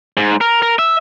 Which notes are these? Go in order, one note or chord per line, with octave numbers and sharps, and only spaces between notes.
G#2
A#4
A#4
E5